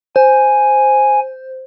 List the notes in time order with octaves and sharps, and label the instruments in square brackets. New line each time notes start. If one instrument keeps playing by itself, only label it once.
[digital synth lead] C5 [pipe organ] G#5